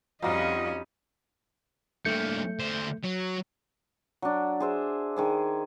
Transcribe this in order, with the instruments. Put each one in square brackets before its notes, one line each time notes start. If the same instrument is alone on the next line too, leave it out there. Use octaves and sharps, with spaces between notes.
[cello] F2 C#4 [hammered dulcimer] G3 D#4 [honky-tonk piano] F4 F#4 F5 [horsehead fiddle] D#5
[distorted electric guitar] G2 A#3 [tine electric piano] A3 G6 C#7
[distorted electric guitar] D3 C5
F#3
[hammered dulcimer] F#3 D4
G#4 C5 E5
D#3 G#4 C5